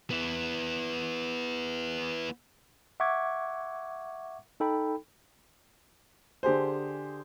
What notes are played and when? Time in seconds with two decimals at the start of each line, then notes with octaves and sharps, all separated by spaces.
0.11 B3 E4
3.00 E5 F#5 C#6 D6 G#6
4.60 D#4 A4 G5 B5
6.43 D3 G4 G#4 C5